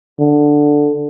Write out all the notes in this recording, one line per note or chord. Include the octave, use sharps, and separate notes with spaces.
D3